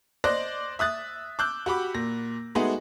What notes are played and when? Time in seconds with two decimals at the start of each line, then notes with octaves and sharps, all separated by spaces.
0.24 C5 D5 D#5 F#6 A#6
0.79 E5 D#6 F#6 A6
1.39 D6 E6 F#6 G6
1.66 F#4 G4 B5 D6
1.94 A#2 A#6
2.55 G#3 A3 B3 D#4 F#4 G#4